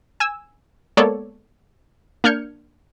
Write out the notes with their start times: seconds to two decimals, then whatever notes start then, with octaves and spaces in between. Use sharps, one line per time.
0.20 G#5 E6
0.97 G#3 A#3 B3 A4 C#5 D5
2.24 A#3 D4 F6 G6 G#6 C#7